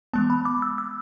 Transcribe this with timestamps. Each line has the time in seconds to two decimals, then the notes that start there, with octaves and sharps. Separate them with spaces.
0.13 E3 G#3 B3 A5
0.30 B5
0.45 D6
0.62 E6
0.78 E6